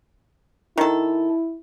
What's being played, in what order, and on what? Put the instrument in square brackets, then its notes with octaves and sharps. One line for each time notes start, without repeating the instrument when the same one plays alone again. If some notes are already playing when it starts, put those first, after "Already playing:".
[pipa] D#3 A4 [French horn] E4